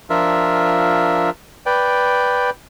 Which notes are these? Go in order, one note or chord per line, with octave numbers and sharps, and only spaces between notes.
F3 D4 F4 A#4 E5
B4 D5 G5